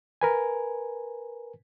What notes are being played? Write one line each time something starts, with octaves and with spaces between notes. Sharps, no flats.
A#4 B4 G#5